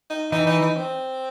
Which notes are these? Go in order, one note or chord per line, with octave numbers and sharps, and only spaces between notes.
D#4
E3 D#4
D#4
D#4
C4